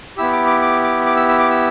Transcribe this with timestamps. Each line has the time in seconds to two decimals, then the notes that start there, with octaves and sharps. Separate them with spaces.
0.17 B3 E4 G4 E6
0.32 D6
0.46 D6
0.62 D6
0.83 D6
1.06 D6
1.16 E6
1.29 E6
1.40 D6
1.51 E6